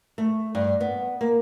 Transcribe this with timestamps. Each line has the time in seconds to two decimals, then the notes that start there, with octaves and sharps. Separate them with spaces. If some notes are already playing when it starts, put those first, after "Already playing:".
0.18 A3
0.55 G2
0.81 B3
1.21 A#3